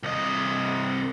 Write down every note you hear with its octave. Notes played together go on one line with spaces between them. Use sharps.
C2 D#5